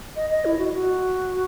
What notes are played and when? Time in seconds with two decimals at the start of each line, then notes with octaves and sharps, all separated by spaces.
0.16 D#5
0.31 D#5
0.45 E4
0.59 F#4
0.74 F#4